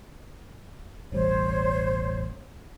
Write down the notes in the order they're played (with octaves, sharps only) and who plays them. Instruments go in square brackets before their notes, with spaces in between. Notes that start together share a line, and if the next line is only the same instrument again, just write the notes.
[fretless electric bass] E1 A1 G3 [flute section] C5 C#5